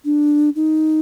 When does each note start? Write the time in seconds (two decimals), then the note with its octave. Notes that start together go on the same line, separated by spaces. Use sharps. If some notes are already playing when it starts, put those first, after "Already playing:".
0.05 D4
0.56 D#4